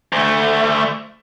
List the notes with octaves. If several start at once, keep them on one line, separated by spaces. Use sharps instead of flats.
D2 A3